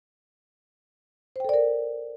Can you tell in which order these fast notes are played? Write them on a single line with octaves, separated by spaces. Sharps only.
C5 G5 A4 D5 A#4